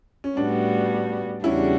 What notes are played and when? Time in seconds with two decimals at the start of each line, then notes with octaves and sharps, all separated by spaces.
0.24 C#4
0.37 A2 G3 B3 D4 F#4
1.44 E2 C#3 G3 C#4 D4 E4 F#4